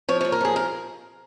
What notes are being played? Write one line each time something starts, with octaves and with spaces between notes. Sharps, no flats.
F3 C#5
A#2 C#5
A#4
F3 G#4
A#4